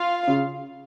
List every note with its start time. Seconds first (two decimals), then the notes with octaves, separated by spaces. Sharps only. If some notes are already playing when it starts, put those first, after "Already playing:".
Already playing: F4 F5
0.28 C#3